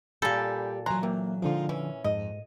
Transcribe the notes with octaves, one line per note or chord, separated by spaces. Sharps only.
A#2 G3 G4 A4 G#5 B5 G6
E3 F#3 G#5 A#5 C6 F#6
C3 A#3
D3 F3 G#3 D#4 F4
E3 C#4
F2 G#2 D#5